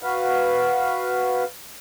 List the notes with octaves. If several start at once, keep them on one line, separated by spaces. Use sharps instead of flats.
F#4 B4 F5